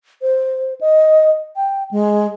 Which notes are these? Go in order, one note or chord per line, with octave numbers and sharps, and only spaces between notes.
C5
D#5
G5
G#3